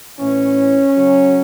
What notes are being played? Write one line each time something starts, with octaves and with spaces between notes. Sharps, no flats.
A2 E3 C#4
C#3 F#3